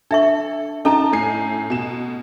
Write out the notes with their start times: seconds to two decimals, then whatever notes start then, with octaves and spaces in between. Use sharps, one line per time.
0.11 D4 A4 E5 C#6
0.85 C#4 D#4 A4 A5 A#5
1.13 A2 G#5 C7
1.70 B2 E7